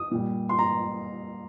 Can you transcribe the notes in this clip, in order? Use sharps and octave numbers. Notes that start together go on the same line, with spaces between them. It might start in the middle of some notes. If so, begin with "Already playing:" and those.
Already playing: D#6
A#2 G3
C6
A#5